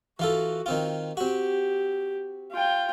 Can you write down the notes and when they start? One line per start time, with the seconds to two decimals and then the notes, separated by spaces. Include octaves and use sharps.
0.19 E3 F4 F#4 A4
0.66 D#3 C4 F4
1.17 C4 F#4 G4
2.52 F4 G5